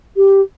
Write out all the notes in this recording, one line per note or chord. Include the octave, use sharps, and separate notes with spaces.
G4